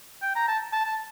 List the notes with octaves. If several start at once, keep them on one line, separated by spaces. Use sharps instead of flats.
G5
A#5
A5
A5
A5